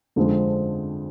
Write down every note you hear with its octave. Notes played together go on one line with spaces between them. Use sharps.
F2 D3 F3 G#3 C4